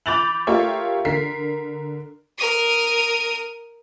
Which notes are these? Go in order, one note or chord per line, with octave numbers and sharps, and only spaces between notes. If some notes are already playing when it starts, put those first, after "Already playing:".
B5 D6 G6 A6 F7 F#7
A3 F4 G4 A#4 C#5 E5
D3 A#4 B6 C7
A#4 D#6